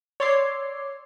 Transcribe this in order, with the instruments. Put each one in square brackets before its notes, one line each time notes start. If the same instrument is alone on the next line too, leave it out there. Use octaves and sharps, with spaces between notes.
[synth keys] C#5 D5 C6 D6 E6 C7